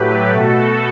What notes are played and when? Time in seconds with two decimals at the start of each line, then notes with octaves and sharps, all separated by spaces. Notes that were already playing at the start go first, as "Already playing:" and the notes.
Already playing: A2 F#3 A3 G4 B4
0.31 B2 A3 F#4 A4